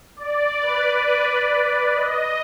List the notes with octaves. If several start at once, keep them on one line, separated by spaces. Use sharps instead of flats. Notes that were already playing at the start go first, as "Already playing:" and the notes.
D5
B4
D#5